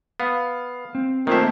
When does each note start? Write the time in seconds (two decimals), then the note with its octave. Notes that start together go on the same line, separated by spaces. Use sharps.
0.20 B3 F5
0.95 C4
1.27 A#2 D#3 A3 A#3 C4 C5 E5 A5